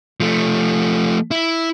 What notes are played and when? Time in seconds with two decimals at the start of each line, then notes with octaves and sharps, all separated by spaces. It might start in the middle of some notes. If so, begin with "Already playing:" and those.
0.20 F3 A3
1.31 E4